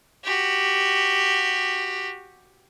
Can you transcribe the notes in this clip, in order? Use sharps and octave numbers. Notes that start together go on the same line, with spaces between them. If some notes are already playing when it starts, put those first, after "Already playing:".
F#4 G4